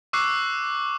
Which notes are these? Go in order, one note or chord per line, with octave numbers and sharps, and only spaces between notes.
C#6 D6 E6 F#6 C7